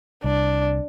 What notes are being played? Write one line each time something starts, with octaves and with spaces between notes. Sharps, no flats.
C2 D4